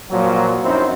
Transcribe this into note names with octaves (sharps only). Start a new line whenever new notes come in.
A#2 F3 F#3
F#2 C4 D#4 E4 F#4